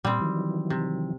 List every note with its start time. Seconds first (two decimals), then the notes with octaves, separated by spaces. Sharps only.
0.05 A#2 G3 C4
0.21 D#3 E3 F#3
0.70 C3